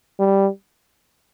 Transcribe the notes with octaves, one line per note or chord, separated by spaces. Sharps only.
G3